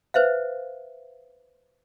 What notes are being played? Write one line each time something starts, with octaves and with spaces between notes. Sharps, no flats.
B4 C5 E5 F5